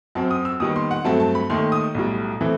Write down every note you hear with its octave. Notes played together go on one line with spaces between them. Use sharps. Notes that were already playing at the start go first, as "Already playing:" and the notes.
F#2 F#3 C4 A5
D#6
E6
D#2 D#3 G3 B3 D#6
C6
F#5
G2 F#3 A3 C4 A5
A5
B5
D#2 D#3 A3 C6
D#6
B1 A2 G3
E3 A3 C4